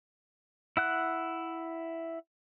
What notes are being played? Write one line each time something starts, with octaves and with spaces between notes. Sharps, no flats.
E4 F#5 F#6